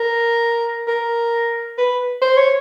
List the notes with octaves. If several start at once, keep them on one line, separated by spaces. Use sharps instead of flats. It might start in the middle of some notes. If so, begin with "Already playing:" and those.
Already playing: A#4
A#4
B4
C5
C#5